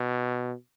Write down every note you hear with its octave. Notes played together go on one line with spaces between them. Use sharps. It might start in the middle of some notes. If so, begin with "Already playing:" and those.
Already playing: B2